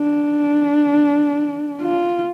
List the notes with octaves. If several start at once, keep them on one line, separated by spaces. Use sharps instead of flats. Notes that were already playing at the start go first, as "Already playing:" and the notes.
Already playing: D4
F4